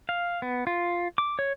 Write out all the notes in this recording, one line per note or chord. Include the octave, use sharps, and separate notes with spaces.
F5
B3
F4
D6
C#5